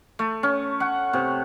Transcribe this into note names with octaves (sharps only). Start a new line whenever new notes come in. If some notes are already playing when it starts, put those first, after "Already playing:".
A3
C#4
F#5
C3